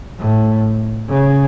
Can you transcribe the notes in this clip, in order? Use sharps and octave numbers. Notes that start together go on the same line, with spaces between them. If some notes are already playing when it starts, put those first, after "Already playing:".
A2
C#3